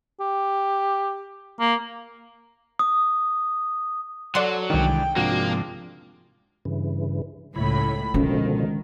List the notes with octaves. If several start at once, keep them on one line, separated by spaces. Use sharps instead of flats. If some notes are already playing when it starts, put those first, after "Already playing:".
G4
A#3
D#6
F#3 A4 D5 F#5 C6
C2 D#3 E3 G#3 D4 G5
G#2 C3 F3 A#3 D4 F#4
G2 C#3 E3
C#2 A2 E4 C#5 B5
B2 D3 D#3 F3 G#3 C#4